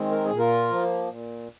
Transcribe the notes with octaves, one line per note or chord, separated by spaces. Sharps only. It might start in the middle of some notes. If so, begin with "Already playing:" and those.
Already playing: D#3 G#3 C4
A#4
G#4
A#2
F4 A#4
F3 A#3
A#2